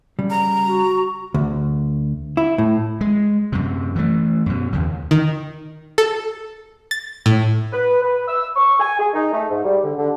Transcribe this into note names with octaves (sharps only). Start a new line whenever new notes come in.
C#3 G3
A#5
F#4
D2
E4
A2
G#3
F#2 C3
E3 A3
F#2 B2
D#2 C#3
D#3
A4
A6
A2
B4
B4
E6
C#6
G#5
G#4
D#4
A3
G#2
G3
D3
D3